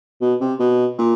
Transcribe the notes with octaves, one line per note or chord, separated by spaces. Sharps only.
B2
C3
B2
A#2